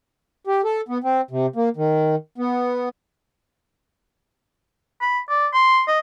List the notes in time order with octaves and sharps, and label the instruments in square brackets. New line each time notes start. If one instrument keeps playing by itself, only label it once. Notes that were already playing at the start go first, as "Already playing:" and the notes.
[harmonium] G4
A4
B3
C4
C3
A#3
D#3
B3
[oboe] B5
D5
C6
D#5